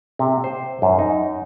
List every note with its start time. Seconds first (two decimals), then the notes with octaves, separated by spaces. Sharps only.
0.19 C3
0.44 C5
0.82 F#2
0.99 D#4